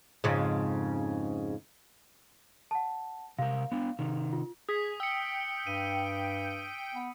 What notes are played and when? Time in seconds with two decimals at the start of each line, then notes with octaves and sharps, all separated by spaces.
0.24 F2 G#2 C#3
2.71 F#5 A5
3.38 C3 A#4 F5
3.72 B3 D4
3.99 C3 D#3
4.33 F4
4.69 G#4 D#6 B6
5.00 G5 E6 C#7
5.67 G2 D#7
6.95 B3